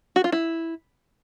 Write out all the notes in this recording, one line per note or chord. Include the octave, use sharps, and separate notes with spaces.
F#4
F4
E4